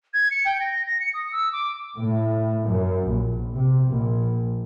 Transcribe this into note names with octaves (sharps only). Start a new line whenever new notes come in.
G#6
C#7
G5
A#6
A#6
C#7
D#6
E6
D6
A2
F#2
A#1
C3
A#1